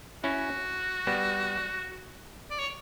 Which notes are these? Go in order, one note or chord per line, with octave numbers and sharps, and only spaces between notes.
C#4 E4 F#4
G3 B3
D5
C#5